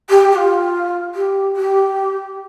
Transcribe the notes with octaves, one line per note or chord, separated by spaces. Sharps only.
G4
G4
F4
G4
G4